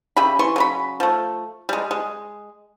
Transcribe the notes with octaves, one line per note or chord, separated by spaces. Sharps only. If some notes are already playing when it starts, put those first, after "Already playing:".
C#3 G4 E5 B5
E3 C6 C#6
C#3 F#3 B5
F3 A3
G3 G#3
G#3